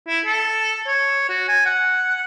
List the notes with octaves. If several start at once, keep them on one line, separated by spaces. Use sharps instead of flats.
E4
A4
C#5
F#4
G#5
F#5